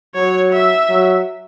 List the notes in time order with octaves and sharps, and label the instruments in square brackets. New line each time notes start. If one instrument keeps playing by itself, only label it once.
[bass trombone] F#3 [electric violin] C#5
[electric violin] E5
[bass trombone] F#3